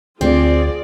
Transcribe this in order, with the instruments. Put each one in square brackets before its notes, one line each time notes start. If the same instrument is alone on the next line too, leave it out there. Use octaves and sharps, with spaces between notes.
[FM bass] D2 [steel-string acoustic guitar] C4 [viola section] F4 G#4 D5